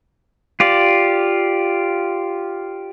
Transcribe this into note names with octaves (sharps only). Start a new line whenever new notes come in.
F4 G4 D5